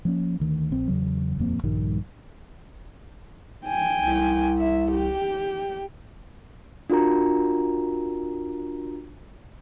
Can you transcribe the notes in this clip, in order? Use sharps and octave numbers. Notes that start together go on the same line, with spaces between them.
F3 A#3 C#4
D2 D#3
A#1 C4
E2 C#3 F#3
D#1 F2 A#3 C4
A#1 G2 D#3 G3
G5 G#5
C2
E5
G4 G5
D4 F4 F#4 A#4 A#5